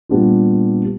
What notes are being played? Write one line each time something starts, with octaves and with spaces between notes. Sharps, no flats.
A#2 G3 B3 D4 F4